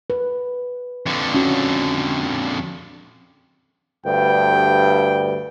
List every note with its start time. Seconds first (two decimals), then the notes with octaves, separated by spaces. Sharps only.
0.10 B4
1.06 F2 D3
1.34 C#4 F#4
4.06 D2 G2 G5